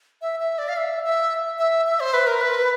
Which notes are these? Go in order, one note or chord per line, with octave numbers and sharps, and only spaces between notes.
E5
E5
D5
F5
E5
E5
E5
E5
C5
B4
A#4
B4